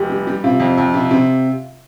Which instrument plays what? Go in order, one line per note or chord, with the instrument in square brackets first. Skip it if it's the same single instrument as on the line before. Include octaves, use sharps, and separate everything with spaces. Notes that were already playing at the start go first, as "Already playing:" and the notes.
Already playing: [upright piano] F1 [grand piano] G4
[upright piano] G3
G3
[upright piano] C3 [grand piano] F4
[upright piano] F2
F2
C3
C3